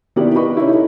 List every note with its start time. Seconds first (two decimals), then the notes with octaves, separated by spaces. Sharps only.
0.16 D#3 B3 E4 G4 A#4 D5
0.35 G4 B4 D#5 B5 C#6
0.57 C#4 D#4 E4
0.71 A4